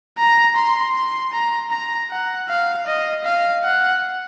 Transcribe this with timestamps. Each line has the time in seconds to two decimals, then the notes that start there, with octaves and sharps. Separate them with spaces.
0.18 A#5
0.56 C6
0.95 C6
1.32 A#5
1.71 A#5
2.10 F#5
2.49 F5
2.87 D#5
3.24 F5
3.64 F#5